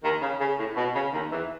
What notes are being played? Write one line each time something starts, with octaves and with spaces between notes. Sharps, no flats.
D#2 D#3
C#3
C#3
A2
B2
C#3
D#2 D#3
E2 E3